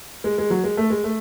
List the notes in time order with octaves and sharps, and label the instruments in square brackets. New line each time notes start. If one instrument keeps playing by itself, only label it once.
[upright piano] G#3
G#3
F#3
G#3
A3
G#3
A3